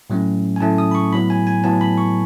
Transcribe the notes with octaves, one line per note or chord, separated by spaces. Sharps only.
A2 F#3 A3 C#4
G#5
A2 F#3 A3 C#4 A5
D#6
B5
C#6
A2 F#3 B3 B5
G#5
G#5
A2 F#3 B3 A5
B5
C#6